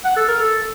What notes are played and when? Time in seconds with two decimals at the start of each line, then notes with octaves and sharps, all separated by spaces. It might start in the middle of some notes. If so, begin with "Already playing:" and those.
0.05 F#5
0.16 A4
0.28 A#4
0.40 A4